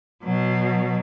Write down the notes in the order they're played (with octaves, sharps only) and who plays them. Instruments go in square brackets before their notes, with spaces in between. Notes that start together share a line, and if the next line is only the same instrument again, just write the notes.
[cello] B2 F#3